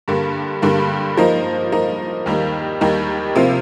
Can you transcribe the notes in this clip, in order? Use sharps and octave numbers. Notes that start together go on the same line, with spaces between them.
G2 D3 G3 A#3
G2 D3 G3 A#3
F3 A#3 D#4
F3 A#3 D#4
D#2 D#3 G3 A#3 D#4
D#2 D#3 G3 A#3 D#4
C3 F3 A#3 F4